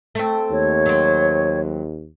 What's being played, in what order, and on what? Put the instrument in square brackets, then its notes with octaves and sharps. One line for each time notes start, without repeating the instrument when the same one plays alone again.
[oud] A3 C4
[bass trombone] D#2 [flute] C#5
[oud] F#3 C4